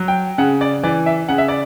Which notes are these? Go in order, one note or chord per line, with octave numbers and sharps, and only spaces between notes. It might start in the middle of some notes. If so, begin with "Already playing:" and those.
Already playing: F#3
G5
C#3 F#5
D5
E3 D5
E5
C#3 F#5
E5
D5